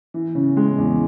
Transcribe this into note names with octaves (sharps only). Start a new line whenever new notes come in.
E3
C#3
G#3
E2